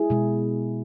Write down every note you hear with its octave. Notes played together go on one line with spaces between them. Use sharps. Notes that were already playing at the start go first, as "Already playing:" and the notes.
Already playing: E4 G#4
B2 G#3